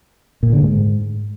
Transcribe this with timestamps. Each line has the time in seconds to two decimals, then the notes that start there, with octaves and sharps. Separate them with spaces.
0.43 A#2
0.52 D3
0.62 G#2